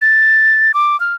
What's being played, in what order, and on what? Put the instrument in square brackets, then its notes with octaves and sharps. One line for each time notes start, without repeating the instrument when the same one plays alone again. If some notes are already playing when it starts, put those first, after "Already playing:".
[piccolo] A6
D6
F6